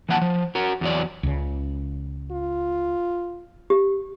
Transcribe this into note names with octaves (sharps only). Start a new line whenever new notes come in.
E3 F3 A#3 F#5 G#5 A5
F3
F#4 A#4
E2 F#3 D5
C#2 C#3
F4
G4